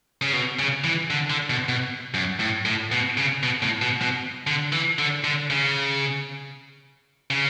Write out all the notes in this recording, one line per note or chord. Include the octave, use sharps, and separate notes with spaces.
C#3
B2
C#3
E3
D3
D3
B2
B2
F#2
A2
A2
B2
C#3
B2
A2
B2
B2
D3
E3
D3
D3
C#3
C#3